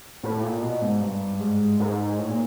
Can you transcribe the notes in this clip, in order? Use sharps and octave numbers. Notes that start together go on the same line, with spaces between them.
A2
A#2
B2
G#2
G2
G#2
G#2
A2
A#2